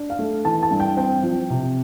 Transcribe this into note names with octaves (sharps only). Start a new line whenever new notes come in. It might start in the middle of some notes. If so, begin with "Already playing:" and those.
Already playing: D4
F5
A3
E3 A5
A5
G2
G5
C4 G5
F3
C3